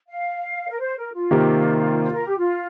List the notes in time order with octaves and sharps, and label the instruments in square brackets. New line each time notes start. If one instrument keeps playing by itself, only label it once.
[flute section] F5
A#4
C5
A#4
F4
[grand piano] C3 D#3 A#3 G4
[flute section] C5
A#4
G4
F4